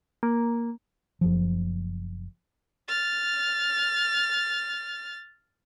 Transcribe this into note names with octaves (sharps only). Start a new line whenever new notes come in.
A#3
F#1 F3
F6 A6